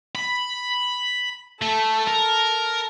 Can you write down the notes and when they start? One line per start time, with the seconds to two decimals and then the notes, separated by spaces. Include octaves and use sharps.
0.15 B5
1.62 A3 A4
2.07 A#4